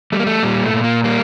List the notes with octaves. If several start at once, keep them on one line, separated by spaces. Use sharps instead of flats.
G3 A3
A#3
A3
A#2 G3
A3
A#2
A#3
G3 A#3